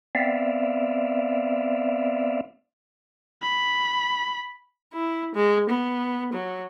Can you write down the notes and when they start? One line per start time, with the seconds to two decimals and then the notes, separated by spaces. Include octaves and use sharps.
0.15 B3 C4 D5 E5 F5
3.42 B5
4.93 E4
5.35 G#3
5.70 B3
6.33 F#3